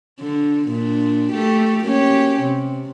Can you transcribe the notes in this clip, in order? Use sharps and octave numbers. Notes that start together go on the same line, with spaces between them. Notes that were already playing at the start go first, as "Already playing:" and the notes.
D3
A#2 D4
A3 G4
A#3 C#4 G4
C3